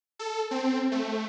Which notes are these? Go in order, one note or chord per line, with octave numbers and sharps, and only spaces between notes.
A4
C4
A3